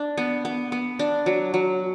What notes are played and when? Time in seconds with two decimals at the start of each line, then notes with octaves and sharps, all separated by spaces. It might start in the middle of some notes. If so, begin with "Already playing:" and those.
Already playing: D4
0.17 B3
0.45 B3
0.72 B3
0.99 D4
1.26 F#3
1.54 F#3